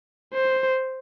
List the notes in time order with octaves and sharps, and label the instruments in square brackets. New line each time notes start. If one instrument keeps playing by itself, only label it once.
[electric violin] C5